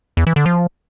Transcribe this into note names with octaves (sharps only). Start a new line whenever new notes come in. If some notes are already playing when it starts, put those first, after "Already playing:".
E2
E3
D3
F3